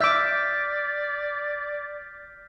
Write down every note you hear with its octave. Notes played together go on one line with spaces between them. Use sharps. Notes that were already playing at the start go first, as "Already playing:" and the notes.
D5 E5 D6 F6 G6 B6